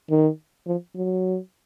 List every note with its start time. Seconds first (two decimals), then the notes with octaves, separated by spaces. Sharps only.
0.10 D#3
0.67 F3
0.96 F#3